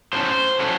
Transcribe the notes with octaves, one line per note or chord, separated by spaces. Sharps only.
A2 F#3 A3 C#4 C5
A2 F#3 A3 C#4